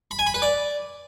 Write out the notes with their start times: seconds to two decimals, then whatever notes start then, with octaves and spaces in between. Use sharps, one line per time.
0.11 B5
0.19 G#5
0.27 B5
0.34 B4
0.42 D5